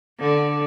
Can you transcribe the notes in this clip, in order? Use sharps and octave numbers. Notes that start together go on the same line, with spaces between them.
D3